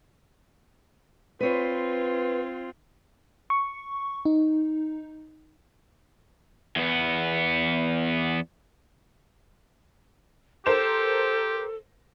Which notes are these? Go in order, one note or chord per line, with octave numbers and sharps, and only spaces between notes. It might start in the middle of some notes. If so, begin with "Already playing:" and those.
C4 F4 B4 C#5
C#6
D#4
E2 B3
G4 A4 A#4 C5 E7